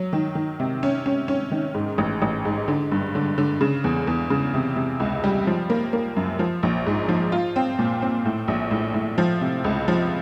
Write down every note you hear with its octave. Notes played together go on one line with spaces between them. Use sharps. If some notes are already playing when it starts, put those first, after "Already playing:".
Already playing: F#3
D#3
D#3
C3
C#4
C#4
C#4
D#3
G#2
A1
A1
G#2
D3
G2
D3
D3
C#3
E2
E2
C#3
C3
C3
C#2
G3
F3
A#3
A#3
F#2
F3
A#1
G#2
F3
F4
C4
A#2
C4
A2
A#1
A2
A2
F3
C3
C#2
F3